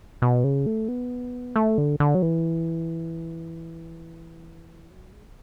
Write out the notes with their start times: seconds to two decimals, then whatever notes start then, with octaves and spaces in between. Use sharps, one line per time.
0.22 B2
0.44 C#3
0.66 A3
0.88 B3
1.56 A3
1.78 D3
2.00 D3
2.15 F#3
2.22 E3
4.90 F#3
5.13 G#3